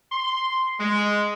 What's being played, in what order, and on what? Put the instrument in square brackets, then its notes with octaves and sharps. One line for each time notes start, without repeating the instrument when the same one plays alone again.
[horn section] C6
G#3